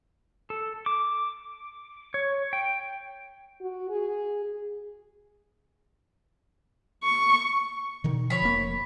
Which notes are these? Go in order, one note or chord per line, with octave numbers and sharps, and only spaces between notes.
A4
D6
C#5
G5
F#4
G#4
C#6
B2 D3 D#3
F3 C#5 B5
F1 A#3